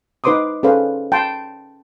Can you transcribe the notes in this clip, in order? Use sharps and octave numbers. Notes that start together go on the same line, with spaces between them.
D#4 B4 C5 C6 D6 D#6
C#4 G#4 A4 B4 C5 F5
G5 A5 B5 C6